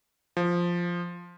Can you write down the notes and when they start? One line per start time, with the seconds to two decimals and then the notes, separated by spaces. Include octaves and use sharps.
0.37 F3